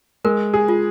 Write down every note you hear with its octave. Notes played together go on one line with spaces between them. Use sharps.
G#3 A#4
G#4
F4